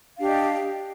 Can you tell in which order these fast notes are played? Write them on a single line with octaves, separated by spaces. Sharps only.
F5 D4 G4 D#5